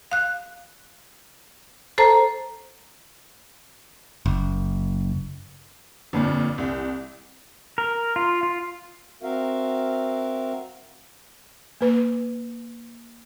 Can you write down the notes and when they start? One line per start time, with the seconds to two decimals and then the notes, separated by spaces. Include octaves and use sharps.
0.12 F5 F#6
1.98 A4 C5 A5 A#5
4.26 F#1
6.13 G1 F2 A#2
6.58 C2
7.78 A#4
8.16 F4
8.43 F4
9.23 C4 F#4 A#4 E5 F5
11.81 A#3 B4